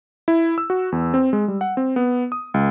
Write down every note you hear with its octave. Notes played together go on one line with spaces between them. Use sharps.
E4
E6
F#4
E2
C4
G#3
G3
F#5
C4
B3
D#6
C#2